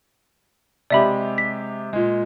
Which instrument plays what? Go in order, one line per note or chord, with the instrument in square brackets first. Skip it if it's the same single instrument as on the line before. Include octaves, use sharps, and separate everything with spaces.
[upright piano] C3 G#3 G4 [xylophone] D5 E5 B5
[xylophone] B6
[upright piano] A#2 G#3